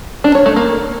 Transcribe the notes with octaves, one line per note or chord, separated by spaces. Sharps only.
D4
C#5
A3
A#3